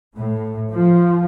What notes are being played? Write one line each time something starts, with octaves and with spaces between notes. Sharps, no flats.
A2
F3